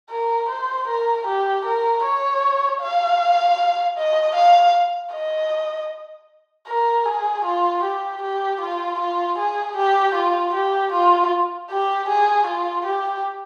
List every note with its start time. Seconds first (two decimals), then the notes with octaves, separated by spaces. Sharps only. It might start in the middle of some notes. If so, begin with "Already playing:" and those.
0.10 A#4
0.49 C5
0.88 A#4
1.27 G4
1.65 A#4
2.04 C#5
2.81 F5
3.97 D#5
4.35 F5
5.13 D#5
6.68 A#4
7.06 G#4
7.45 F4
7.84 G4
8.22 G4
8.61 F4
9.00 F4
9.38 G#4
9.77 G4
10.15 F4
10.54 G4
10.92 F4
11.70 G4
12.09 G#4
12.47 F4
12.86 G4